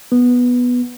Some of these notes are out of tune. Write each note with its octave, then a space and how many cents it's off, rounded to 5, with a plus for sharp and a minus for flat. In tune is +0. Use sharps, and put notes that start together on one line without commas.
B3 -5